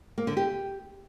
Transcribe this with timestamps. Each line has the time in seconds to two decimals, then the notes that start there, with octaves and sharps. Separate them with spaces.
0.18 A#3
0.27 D3
0.37 G4